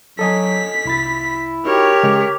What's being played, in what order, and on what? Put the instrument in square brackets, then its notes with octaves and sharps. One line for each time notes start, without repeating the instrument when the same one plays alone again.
[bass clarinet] F#3 [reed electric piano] A4 D#5 G#5 [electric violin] B6
[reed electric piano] C2 B5 A6 [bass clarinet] E4
[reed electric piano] D#4 F#4 [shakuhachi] G4 [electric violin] A#4 C#5
[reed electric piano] C#3 G#3 C#6